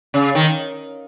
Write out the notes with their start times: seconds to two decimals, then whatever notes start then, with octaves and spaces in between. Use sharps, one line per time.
0.14 C#3
0.35 D#3